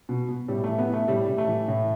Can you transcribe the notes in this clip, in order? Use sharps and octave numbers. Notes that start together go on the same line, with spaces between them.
B2
B2
A2 G3
E3 A3
B3
E3
A3
A2 G3
A2
A3
E3
A2